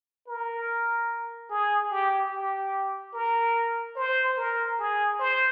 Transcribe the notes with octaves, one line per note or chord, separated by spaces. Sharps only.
A#4
G#4
G4
G4
A#4
C5
A#4
G#4
C5